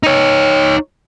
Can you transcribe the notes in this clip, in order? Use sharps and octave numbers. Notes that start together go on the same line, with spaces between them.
D#4 C#5